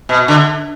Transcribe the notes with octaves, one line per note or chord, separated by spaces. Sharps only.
B2
D3